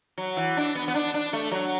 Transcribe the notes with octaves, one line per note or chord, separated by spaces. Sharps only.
F#3
E3
D4
B3
B3
D4
D4
A3
F#3